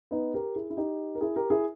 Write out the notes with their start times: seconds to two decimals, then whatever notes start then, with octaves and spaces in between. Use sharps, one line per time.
0.11 B3 D#4
0.34 G4 A#4
0.56 E4 G#4
0.70 E4
0.77 D#4 G4
1.15 A#4
1.21 E4 G#4
1.36 G4 A#4
1.50 E4 G#4